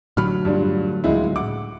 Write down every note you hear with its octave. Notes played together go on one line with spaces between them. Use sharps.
A2 D3 F#3 B5 F6
G2 D4 F4
C#2 G#3 E4
F#5 D6